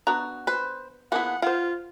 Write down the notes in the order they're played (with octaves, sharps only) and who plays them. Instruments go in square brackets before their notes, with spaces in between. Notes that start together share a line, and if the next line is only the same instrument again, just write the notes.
[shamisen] B3 D4 A#5 [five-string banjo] F#4
[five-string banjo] B4 C5
[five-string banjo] F3 B3 G#4 [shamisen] A#3 E4 [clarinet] F#5
[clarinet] F4 [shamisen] C5 F#5 [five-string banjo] F5